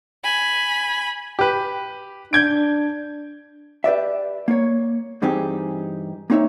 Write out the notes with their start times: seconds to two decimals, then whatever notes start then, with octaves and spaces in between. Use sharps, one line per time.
0.23 G#5 B5
1.39 G4 B4
2.33 D4 G6 G#6 D7
3.84 G4 B4 D5 E5
4.48 A#3 C#5
5.22 G2 E3 C4 D#4 G4 G#4
6.30 A#3 C4 D#4 C#5 E5